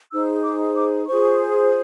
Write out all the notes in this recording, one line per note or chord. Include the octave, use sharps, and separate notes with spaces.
D#4 G#4 C5 E6
D6
D6
F4 G#4 C5 C#6